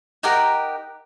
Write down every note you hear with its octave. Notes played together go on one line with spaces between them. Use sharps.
D#4 G4 A#4 F#5